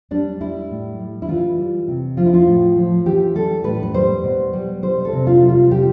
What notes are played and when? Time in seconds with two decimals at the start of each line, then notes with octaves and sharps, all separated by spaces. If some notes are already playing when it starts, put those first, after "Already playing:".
0.11 G3 D4
0.40 G3 E4
0.70 A2
0.99 G3
1.22 E4
1.29 E3 F4
1.58 G3
1.88 C3
2.17 F3 F4
2.26 E4
2.34 F4
2.47 A2
2.76 F3
3.06 E3 G4
3.35 G3 A4
3.64 A2 B4
3.83 B4
3.94 G3 C5
4.24 B2
4.53 G3
4.82 G3 C5
5.05 A4
5.13 C3
5.27 F4
5.42 G3
5.49 F4
5.71 G3 G4